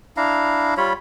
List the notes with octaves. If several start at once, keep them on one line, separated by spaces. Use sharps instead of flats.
D4 E4 F5 A#5
G3 F4 C#5 B5